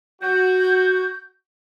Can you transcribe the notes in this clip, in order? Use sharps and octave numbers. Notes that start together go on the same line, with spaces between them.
F#4 G6